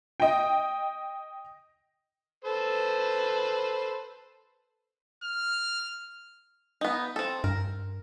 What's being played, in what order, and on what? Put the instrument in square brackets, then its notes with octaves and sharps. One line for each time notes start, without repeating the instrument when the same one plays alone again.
[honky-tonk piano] D#5 G5
[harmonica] A4 B4 C5
[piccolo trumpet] F6
[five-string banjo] B3 D#4
C4 A4
[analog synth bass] G2 [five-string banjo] A#4